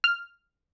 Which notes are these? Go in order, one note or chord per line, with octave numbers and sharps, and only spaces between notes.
F6